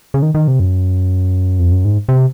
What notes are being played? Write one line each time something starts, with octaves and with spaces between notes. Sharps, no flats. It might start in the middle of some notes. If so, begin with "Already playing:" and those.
C#3
D#3
D#3
C3
F#2
F2
F#2
G#2
C3